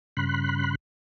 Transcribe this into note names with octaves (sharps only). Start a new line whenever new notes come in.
G2 C#3 B5 C6 F#6